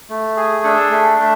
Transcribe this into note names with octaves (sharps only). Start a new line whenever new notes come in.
A3
G#4
D4 A4
A3
A3